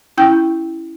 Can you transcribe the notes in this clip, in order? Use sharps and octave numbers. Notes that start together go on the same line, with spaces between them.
C#4 E4 G5 G6